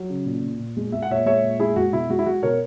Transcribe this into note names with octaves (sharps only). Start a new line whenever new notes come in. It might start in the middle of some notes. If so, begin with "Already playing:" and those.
Already playing: F#3
C#3
A#2
A#2
A#2
G#3
G#3 E5
F#5
A#2 C#5 E5
G#3 C#5 E5
A#2
G#3 E4 G#4
G#3 F#4
B2 E4
G#3 F#4
E4
G#3 F#4
B2 A#4 C#5